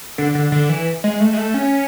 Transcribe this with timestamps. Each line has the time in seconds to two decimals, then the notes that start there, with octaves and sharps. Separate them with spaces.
0.18 D3
0.35 D3
0.52 D3
0.69 E3
1.04 G#3
1.20 A3
1.33 G#3
1.38 A3
1.54 C#4